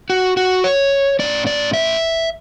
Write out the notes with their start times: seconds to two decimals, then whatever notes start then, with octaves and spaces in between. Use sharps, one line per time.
0.10 F#4
0.37 F#4
0.64 C#5
1.19 A2 G#3 C#4 D5
1.47 D5
1.74 E5